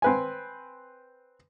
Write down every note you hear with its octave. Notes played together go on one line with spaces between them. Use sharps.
C4 B4 G#5